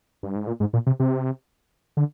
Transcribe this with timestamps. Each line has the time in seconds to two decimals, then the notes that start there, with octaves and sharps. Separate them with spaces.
0.23 G2
0.35 G#2
0.47 A#2
0.60 G#2
0.73 A#2
0.87 C3
1.00 C3
1.97 D3